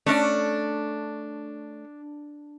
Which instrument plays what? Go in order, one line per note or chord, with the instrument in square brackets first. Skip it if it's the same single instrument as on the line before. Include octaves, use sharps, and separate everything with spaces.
[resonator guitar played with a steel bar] A3 C#4 D5 [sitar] D4